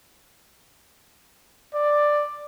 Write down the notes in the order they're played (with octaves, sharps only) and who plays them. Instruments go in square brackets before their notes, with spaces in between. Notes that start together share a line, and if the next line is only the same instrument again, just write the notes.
[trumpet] D5